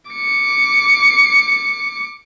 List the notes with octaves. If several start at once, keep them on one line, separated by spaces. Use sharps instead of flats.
D6 C#7